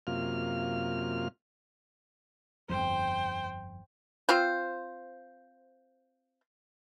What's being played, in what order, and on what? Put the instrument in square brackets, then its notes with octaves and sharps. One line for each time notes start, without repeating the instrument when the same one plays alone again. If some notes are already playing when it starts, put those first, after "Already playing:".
[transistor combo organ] F#2 C3 A#3 F4 F6
[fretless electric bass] G1 F2 [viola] C5 G5
[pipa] C4 F4 C5